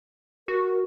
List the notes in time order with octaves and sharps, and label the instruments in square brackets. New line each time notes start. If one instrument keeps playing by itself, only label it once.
[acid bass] F#4 [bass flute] A#4